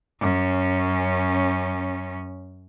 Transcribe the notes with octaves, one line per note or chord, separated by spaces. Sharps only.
F#2 C#4